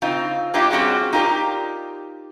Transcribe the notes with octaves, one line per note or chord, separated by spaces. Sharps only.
C#3 C4 D#4 F4
A#3 B3 D4 E4 F4 G4
G3 C4 C#4 F#4 G#4
D#4 F4 G4 A#4 D5